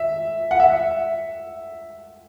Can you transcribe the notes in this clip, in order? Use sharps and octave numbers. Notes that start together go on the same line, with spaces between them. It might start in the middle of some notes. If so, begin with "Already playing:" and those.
Already playing: E5
F#5
E5